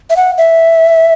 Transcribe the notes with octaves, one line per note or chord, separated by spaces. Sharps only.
E5
F#5
E5